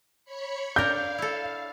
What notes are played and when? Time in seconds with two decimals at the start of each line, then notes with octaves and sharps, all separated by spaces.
0.25 C#5 B5 C#7
0.76 D4 A#4 F5 G6
1.18 E4 A4